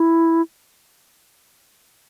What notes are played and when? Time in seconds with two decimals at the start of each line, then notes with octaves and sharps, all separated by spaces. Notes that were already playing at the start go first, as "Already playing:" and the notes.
Already playing: E4